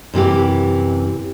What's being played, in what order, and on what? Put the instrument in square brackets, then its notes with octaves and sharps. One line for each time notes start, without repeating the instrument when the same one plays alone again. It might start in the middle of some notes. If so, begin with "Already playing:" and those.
[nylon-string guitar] F#2 C3 E3 G4